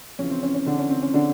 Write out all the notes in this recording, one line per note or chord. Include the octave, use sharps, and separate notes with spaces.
F2 C#3 E3 C#4
C4
C#4
C#4
D3 D4
C#4
C4
C#4
D3 D4